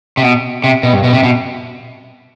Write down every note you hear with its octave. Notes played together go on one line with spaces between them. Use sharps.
C3
B2
C3
B2
G2
B2
C3
B2